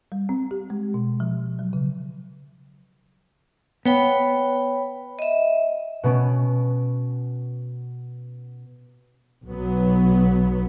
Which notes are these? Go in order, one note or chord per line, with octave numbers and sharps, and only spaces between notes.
G3
C4
G4
G#3
B2
F3
F#3
C#3
B3 C#5 G5 B5
D#5 E5
B2 B3 C#4 D7
B1 F#3 B3